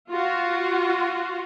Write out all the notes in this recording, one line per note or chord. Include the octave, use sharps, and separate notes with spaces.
F4 F#4